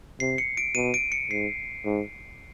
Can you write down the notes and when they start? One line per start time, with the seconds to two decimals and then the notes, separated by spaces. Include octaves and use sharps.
0.20 C3 C7
0.38 C#7
0.57 D7
0.75 B2 D#7
0.94 D7
1.12 C#7
1.30 G#2 C7
1.85 G#2